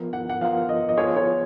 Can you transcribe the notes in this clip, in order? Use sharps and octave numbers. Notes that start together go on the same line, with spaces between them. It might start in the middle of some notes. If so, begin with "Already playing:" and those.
Already playing: F3 B3 F4 A#4
F#5
F#5
F3 B3 F4 A#4 F5
D#5
D#5
F3 B3 F4 G#4 C#5
C#5